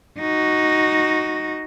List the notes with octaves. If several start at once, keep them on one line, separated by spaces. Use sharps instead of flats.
D#4 F#4